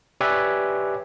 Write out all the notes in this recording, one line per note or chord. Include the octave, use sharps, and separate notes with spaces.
G4 B4 C#5 D5 E5 G#5